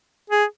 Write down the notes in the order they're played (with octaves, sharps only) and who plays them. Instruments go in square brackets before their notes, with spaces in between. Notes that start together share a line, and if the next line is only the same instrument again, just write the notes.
[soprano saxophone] G#4